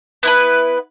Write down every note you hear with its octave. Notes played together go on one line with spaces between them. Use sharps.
B3 E4 B4